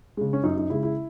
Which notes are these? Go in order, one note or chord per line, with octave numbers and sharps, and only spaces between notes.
C#3 G#3
C#4
F#2 D#4
D#4
C#3 G#3 E4
E4